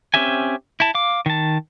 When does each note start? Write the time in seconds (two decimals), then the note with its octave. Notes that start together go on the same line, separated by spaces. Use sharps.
0.14 C4 C#4 G4 E5 G#5
0.80 E4 A5
0.95 F5 D6
1.26 D#3 A5